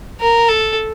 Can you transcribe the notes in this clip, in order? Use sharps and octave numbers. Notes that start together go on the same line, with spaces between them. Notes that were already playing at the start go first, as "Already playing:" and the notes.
A#4
A4